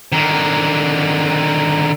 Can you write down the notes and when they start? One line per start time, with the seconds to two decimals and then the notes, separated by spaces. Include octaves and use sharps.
0.12 D3 D#3